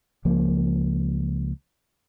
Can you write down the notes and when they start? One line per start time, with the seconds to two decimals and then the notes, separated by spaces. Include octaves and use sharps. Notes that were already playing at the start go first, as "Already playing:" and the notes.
0.25 C#2 F3 A#3